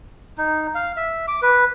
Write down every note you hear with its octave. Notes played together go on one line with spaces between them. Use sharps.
D#4
F5
E5
D6
B4